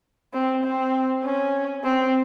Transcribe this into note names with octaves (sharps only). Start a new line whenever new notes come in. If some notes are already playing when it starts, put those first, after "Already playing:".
C4
C4
C#4
C4